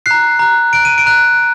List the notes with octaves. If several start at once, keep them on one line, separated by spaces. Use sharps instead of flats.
A#5 F#6 C7
A#5 F#6
A#5 F#6 D7
D#7
D7
A#5 F#6